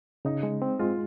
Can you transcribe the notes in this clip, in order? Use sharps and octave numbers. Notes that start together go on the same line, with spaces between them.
C#3 D#4
G#3
C4
G#3 F4